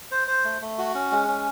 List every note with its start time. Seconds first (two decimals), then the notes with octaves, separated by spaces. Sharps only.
0.11 C5
0.28 C5
0.45 A3
0.61 A3
0.78 F#4
0.95 C#4
1.11 G#3
1.28 C#4